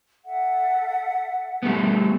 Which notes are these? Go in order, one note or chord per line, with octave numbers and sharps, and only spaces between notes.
A4 E5 F#5
G3 A3 B3